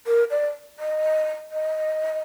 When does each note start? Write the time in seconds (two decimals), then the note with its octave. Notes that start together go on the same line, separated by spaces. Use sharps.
0.07 A#4
0.31 D5
0.79 D#5
1.52 D#5